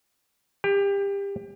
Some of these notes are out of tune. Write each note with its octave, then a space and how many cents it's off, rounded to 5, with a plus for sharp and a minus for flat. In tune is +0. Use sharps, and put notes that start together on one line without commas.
G4 +25